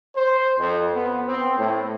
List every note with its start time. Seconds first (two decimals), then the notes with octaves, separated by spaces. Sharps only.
0.16 C5
0.57 F2
0.93 B3
1.26 C4
1.57 A2